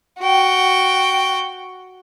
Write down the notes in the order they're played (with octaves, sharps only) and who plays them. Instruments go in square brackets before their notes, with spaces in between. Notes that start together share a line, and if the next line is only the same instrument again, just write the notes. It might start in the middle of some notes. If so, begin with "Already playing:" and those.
[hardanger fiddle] F#4 G5